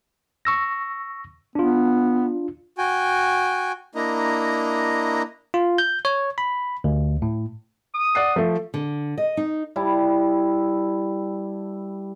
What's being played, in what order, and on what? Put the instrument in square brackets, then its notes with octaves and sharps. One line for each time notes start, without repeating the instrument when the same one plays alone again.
[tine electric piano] C#6 E6 A#6
[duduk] B3 [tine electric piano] D4 F4
[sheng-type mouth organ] F#4 G5 G#5
A#3 D4 E4 D#5 A#5
[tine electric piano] F4
G6
C#5
B5
D2
A2
[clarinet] D#6
[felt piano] D5 F#5 C7
F3 A3
[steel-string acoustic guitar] D3
D#5
D#4
[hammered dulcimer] G3 E4 A5